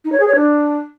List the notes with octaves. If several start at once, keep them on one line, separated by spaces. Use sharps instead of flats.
D#4
C#5
G#4
C#5
D4